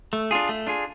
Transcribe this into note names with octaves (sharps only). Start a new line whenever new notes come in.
A3
D4 F4 G#4
A3
D4 F4 G#4